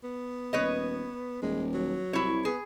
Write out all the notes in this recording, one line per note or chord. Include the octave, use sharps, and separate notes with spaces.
B3
D#1 B4 C#5 D#5
D#1 G#3
F#3
C2 E4 C#5
B3 G#4